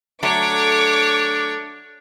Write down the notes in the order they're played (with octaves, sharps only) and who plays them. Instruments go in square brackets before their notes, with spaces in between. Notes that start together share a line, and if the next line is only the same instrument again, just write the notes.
[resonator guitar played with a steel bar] F#3 A3 [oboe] D4 [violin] C#5 [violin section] D6